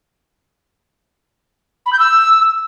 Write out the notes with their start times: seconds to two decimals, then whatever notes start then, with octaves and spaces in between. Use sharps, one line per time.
1.86 B5
1.92 G6
1.99 E6